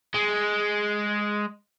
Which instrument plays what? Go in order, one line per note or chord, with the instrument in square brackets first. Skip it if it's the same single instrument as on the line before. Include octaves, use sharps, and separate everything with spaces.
[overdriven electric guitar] G#3